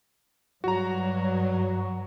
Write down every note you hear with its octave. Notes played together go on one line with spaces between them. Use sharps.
G2 F#3 F#4 A#5